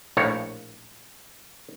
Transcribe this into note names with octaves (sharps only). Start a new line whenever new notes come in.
A#1 A2 A#3 C#5